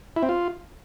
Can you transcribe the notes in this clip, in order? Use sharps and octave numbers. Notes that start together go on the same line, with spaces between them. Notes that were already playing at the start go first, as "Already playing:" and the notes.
E4
C4
F4